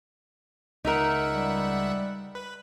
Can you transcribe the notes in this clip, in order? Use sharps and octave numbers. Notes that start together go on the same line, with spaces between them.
C#2 D#4 A#4 E5 F#5
G3
B4